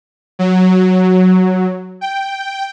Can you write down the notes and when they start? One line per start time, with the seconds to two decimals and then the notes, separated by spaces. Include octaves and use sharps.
0.39 F#3
2.01 G5